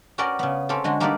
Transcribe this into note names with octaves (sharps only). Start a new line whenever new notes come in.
C#4 F#4 A#4 B4 D5 G5
C#3 B3
C4 C#4 G4 A4
D3 G#3 F#4
G3 A#3 D#4 A4 B4 D5